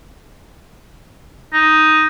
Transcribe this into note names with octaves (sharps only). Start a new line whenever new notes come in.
D#4